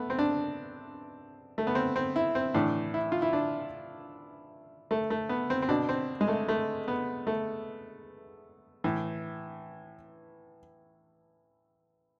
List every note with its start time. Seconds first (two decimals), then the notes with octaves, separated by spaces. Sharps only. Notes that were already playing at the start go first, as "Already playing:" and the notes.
Already playing: A3 B3
0.10 C4
0.19 D4
1.58 A3
1.67 B3
1.75 C4
1.96 C4
2.16 E4
2.35 C4
2.54 A2 E3 D4
2.94 E4
3.12 F4
3.22 E4
3.33 D4
4.91 A3
5.10 A3
5.29 B3
5.50 C4
5.62 C4
5.69 B2 D4
5.89 C4
6.21 G#3
6.28 A3
6.48 A3
6.88 B3
7.27 A3
8.84 A2 E3